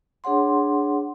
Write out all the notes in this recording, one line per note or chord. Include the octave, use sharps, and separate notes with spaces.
D4 G#4 C#5 F#5 C6